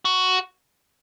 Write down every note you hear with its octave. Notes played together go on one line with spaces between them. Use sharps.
F#4